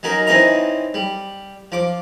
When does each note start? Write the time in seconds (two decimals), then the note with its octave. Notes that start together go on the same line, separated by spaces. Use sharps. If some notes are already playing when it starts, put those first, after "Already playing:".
0.03 F#3 C#4 D#4 A#4
0.27 E3 C4 C#4 D#4 D#5 A#5
0.94 G3
1.72 F3 D6